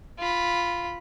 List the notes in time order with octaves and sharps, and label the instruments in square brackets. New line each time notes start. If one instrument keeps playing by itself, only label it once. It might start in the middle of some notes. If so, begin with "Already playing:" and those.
[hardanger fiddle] F4 B5